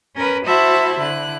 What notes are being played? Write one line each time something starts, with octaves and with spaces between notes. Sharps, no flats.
C#4 A#4 B4
E4 F#4 C5 E5 A5 B5
D3 E4 F#6